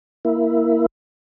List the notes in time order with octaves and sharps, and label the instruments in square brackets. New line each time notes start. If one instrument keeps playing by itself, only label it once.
[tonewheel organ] A#3 E4